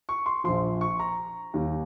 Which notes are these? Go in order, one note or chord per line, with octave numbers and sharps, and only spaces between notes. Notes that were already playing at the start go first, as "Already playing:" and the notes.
C#6
C6
A#1 A#2 F3 C6
C#6
A#5
D#2 D#3 G3